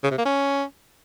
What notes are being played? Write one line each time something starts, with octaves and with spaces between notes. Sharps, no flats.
C#3
C3
A#3
C#4